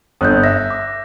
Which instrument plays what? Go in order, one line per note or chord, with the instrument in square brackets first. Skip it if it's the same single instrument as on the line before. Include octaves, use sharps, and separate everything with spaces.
[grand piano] G1 [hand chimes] D#6 F#6 G6
[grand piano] E5 [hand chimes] A#6
[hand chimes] D6